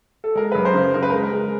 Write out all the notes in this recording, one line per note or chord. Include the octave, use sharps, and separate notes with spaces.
A4
G#3 A#4
F#2 B4
A#4 C5
C#3
C#3 A#4
B4
G#3 A#4
A#4
G#3